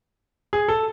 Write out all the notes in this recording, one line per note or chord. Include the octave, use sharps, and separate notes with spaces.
G#4
A4